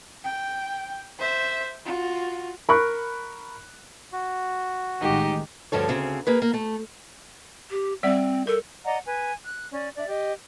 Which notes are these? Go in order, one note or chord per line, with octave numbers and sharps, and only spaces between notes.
G5
C5 E5
F4 F#4
A#4 B5 C#6 F#6
F#4
A1 D#3 G#3 D#4 G4
D2 G2 F3 A4 C#5
D2 C#3 C4 G#4
A#3 G#4 B4
A#3
A3
G4
G3 C4 D5 F#5
A4 A#4
D5 D#5 F#5 A#5
B4 G#5
F#6
C#4 D5
D4 D5 E5
G4 D#5